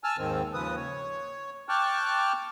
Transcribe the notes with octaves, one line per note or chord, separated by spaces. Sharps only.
G#5 A5 E6 F6
D#2 G#2 D#3 C4
D#2 C#3 F3 B4 D#6
C#5
G5 A5 C#6 D6 F6 F#6